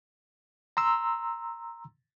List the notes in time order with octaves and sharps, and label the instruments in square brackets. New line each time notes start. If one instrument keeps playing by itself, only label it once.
[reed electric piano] A#5 C6 E6